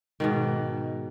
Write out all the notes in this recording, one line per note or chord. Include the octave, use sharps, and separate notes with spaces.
G#2 B2 D#3